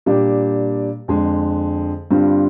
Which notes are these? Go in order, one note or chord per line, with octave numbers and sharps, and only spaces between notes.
A#2 G3 D4 G4
F2 D3 G#3
G2 D3 G3 C4 F4